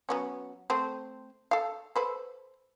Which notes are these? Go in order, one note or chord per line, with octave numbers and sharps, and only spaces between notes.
F#3 B3 C#4
A3 C4 C5
A4 F5
A4 B4 C5